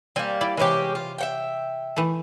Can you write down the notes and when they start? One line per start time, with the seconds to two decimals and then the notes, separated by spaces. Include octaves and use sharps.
0.16 G3 A#3 C4 G#5
0.41 E4 D5 G5
0.57 C3 E3 G#3 C#4 G4
0.95 F4
1.18 E5 F#5 G5
1.96 E3 A3